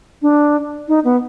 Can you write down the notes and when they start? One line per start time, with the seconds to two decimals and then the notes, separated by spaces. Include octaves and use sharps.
0.22 D4
0.88 D#4
1.04 B3